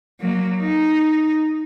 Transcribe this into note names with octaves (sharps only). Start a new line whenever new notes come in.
F#3 A#3
D#4